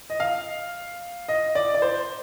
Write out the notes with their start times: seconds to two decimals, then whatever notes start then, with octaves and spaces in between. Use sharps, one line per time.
0.10 D#5
0.20 F5
1.29 D#5
1.55 D5
1.74 D5
1.82 C5